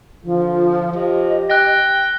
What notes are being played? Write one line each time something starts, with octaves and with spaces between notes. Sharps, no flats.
D3 F3 F4
F3 G4 D#5
G5 F#6 A#6